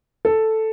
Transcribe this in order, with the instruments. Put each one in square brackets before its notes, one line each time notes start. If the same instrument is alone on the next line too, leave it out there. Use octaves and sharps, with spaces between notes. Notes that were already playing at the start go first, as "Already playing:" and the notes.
[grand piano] A4